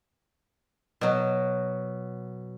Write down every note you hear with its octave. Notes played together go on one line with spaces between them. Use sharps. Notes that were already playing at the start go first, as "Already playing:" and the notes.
B2 F#3